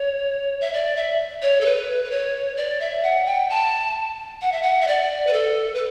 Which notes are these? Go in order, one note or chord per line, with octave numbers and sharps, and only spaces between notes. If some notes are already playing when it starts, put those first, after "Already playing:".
Already playing: C#5
E5
D5
E5
C#5
A4
B4
B4
C#5
D5
E5
F#5
G5
A5
F#5
E5
F#5
E5
D5
B4
A4
B4